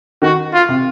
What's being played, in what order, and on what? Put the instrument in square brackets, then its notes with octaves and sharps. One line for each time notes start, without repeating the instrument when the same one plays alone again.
[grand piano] D#3 [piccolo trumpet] F#4
[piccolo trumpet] F4
[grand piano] C3